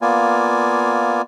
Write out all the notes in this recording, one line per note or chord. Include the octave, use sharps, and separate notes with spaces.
A#3 B3 F4 D5 G#5